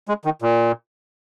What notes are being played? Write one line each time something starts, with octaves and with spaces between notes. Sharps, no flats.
G#3
D#3
A#2